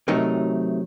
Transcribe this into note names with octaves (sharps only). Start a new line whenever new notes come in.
C3 D#3 F#3 A3 D#4